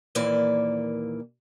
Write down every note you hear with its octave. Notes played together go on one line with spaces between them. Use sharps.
D#2 A#2 E3 A#3 D5